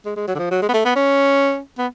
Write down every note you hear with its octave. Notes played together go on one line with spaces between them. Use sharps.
G#3
G#3
F#3
D3
F3
F#3
G#3
B3
A3
B3
C#4
B3